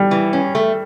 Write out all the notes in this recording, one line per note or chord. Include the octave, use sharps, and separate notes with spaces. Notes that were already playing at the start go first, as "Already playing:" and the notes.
Already playing: G3
E3
C#4
A3